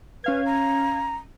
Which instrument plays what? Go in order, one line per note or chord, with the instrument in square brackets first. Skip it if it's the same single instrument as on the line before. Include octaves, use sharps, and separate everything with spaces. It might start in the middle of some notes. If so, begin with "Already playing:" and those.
[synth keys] C#4 F5 G#6 [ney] B4
[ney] A#5